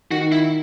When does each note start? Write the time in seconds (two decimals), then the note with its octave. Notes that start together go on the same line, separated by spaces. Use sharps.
0.11 D#3 F#4
0.32 E4